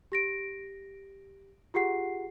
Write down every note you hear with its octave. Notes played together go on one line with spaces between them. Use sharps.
G4 A#6 D7
F4 G4 G#4 F#5 C7